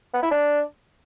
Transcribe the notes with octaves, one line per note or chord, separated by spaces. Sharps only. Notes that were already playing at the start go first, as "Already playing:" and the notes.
B3
E4
D4